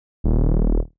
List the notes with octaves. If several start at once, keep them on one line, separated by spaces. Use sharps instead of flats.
D#1